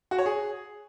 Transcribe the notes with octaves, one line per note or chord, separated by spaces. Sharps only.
F#4
C#5
G#4